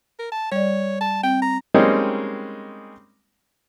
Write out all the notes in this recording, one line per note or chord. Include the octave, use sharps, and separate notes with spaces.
A#4
A5
G3 C#5 D5
A5
C4 G5
A#5
G3 G#3 A#3 C4 C#4 D#4